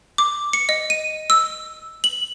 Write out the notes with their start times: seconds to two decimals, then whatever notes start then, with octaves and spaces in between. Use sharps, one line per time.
0.18 D6
0.53 C#7
0.69 D#5
0.90 D#7
1.30 E6
2.04 F#7